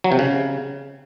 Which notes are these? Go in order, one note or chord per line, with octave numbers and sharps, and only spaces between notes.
F#3
C3
C#3